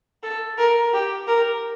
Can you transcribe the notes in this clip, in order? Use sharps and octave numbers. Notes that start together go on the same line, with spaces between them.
A4
A#4
G4
A#4